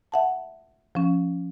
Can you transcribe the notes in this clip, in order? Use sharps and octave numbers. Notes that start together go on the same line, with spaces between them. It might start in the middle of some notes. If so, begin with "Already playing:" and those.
E5 F#5 A5
F3 C#4